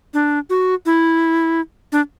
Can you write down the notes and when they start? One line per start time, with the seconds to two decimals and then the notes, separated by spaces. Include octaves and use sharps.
0.14 D4
0.50 F#4
0.86 E4
1.92 D4